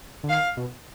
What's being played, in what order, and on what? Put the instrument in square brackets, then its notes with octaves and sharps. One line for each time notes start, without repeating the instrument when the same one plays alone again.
[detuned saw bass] D3
[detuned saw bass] D#3 [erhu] F5
[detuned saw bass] B2